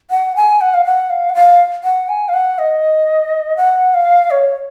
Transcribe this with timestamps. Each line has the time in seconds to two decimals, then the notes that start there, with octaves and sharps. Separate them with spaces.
0.10 F#5
0.36 G#5
0.61 F#5
0.74 F5
0.85 F#5
1.10 F5
1.29 F#5
1.35 F5
1.84 F#5
2.09 G#5
2.28 F5
2.34 F#5
2.58 D#5
3.57 F#5
3.94 F5
4.31 C#5